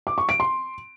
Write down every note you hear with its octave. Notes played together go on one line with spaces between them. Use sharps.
D6
C#6
D7
C6